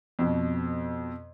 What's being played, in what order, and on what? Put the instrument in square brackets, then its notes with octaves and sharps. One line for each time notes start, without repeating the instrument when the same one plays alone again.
[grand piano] F2 B2